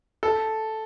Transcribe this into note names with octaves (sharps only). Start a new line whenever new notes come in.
A4